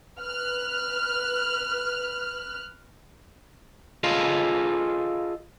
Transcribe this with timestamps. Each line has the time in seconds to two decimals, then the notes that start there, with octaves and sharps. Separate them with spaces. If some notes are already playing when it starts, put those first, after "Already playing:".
0.20 B4 F6 F#6
4.04 F4 G#4 A4 B4 D#5 F5